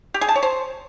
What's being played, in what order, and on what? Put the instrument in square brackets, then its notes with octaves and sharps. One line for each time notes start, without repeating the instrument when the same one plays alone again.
[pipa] G4
G#4
A5
C#5
C5